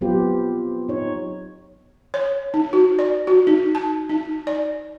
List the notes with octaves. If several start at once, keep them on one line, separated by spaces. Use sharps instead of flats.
F#3 B3 C4 F4 G4 B4
D#4 C#5
C#5
D#4
F#4
D5
F#4
D#4
A5
D#4
D5